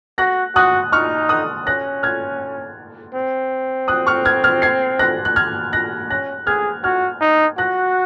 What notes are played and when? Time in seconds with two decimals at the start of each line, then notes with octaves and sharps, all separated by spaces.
0.18 F#4 F#6 A#6
0.55 F#4 D#6 F#6
0.92 D#4 C#6 F6
1.29 D#6 F#6
1.67 C#4 F#6 A#6
2.03 F6 G#6
3.14 C4
3.88 D#6 F#6
4.07 C#6 F6
4.25 F6 G#6
4.44 F6 G#6
4.62 G#6 C7
4.99 F#6 A#6
5.25 F#6
5.36 F6 G#6
5.73 F#6 A#6
6.10 C#4 F#6 A#6
6.47 G#4 F6 G#6
6.84 F#4 F6 G#6
7.21 D#4
7.58 F#4 F#6 A#6